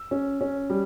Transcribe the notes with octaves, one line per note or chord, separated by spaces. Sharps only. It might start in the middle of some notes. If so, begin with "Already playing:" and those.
Already playing: E6
C#4
C#4
G3